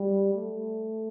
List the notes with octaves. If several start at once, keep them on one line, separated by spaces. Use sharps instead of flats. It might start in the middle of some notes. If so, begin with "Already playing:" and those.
Already playing: G3
A3